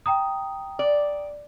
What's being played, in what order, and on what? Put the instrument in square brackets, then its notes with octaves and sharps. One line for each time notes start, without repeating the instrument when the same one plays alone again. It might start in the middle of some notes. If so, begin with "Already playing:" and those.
[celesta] G5 A#5 D#6
[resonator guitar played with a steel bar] D5